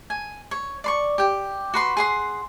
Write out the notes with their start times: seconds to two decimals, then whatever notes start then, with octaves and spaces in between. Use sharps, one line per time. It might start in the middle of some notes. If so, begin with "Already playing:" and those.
0.10 G#5
0.51 C#5
0.84 D5 C6 C#6
1.18 G4 G5
1.74 F#4 B4 C6
1.97 G#4 F#5 C6